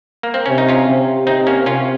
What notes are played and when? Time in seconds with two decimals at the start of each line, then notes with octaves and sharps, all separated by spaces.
0.23 A#3
0.34 C4
0.46 C3 C#4
0.58 D#4
0.69 C#4 F4
0.88 C3
1.27 C3 C4 D#4
1.47 A#3 C#4
1.66 C3 C#4 F4